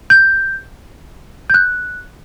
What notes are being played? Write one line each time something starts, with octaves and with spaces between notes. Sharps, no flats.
G6
G6
F#6